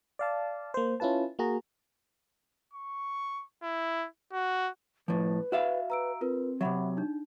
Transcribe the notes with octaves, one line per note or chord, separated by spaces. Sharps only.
D5 F5 A5
A#3 C5
C#4 E4 F4 B4 A5
A#3 F#4 G#4 A#5
C#6
E4
F#4
A2 F3 B4
F#4 E5 F5
B4 A#5 E6 D7
C4 F4 A#4 B4
C3 F#3 E5 F#5 B5
D4 D#4